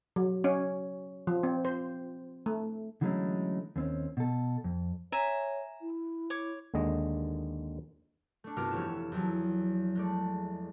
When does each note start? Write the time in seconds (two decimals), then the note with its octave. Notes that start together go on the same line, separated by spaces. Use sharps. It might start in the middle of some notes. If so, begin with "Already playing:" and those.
0.16 F#3
0.44 C#4
1.27 F3
1.43 C4
1.65 C5
2.46 A3
3.01 D3 E3 F#3 G#3 A3 C#4
3.76 D#2 C4 C#4
4.17 B2 A4
4.64 F2
5.12 C#5 E5 G#5 A#5
5.82 E4
6.30 C#5 D6
6.74 D#2 D3 G#3 D#5
8.44 A3 D4
8.56 G1 C2 F#4 D6 F6
8.71 F1 E3 G4 C#5 E7
9.12 E2 F3 F#3
9.95 G#3 A3 D5